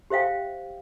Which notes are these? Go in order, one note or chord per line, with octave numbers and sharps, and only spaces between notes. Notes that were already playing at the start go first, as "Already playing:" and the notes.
G4 C5 E5 F5 G5